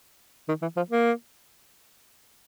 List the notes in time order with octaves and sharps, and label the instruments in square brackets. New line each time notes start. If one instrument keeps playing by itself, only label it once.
[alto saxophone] D#3
E3
F3
A#3